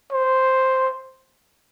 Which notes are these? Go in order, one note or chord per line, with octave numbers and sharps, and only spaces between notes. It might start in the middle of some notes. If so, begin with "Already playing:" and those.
C5